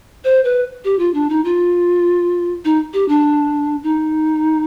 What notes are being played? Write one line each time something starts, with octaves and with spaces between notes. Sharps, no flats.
C5
B4
G4
F4
D4
D#4
F4
D#4
G4
D4
D#4